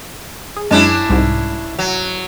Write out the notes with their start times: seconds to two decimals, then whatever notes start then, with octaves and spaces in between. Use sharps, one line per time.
0.56 G#4
0.71 F#2 G#3 C#4 D4 E4 A5
1.10 C2 G#2
1.79 F#3